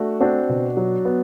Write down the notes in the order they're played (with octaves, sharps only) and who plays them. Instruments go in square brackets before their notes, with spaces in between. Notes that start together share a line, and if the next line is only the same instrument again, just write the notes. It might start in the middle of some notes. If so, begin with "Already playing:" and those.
Already playing: [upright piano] A3 [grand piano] D4 F#4
[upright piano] C4 [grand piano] D4 F#4
[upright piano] B2
F#3
B3